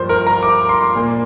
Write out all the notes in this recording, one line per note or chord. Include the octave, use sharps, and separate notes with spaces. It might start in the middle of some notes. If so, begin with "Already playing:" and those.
Already playing: G2 F3 A#3 C5
A#4
A#5
D6
C6
A#2 A#3